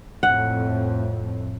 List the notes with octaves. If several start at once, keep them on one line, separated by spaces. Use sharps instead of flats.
F2 A2 F#5